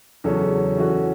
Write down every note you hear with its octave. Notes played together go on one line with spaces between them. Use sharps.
E2 C#3 F#3 C#4 A4
E3 C#4 F#4 A4